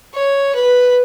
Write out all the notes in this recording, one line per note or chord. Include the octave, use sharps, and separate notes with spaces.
C#5
B4